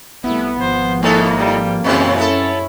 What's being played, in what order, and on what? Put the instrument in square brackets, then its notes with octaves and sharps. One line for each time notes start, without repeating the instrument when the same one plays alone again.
[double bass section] C2 A3 [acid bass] B3 [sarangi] E4
[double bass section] G#1 F3 [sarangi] C5
[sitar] G#2 B3 D#4 [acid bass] A#3 [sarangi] A4
[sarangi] G3
[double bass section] F#2 C#4 [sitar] A#2 C#3 E3 [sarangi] C4
[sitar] B3 A4 [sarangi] E4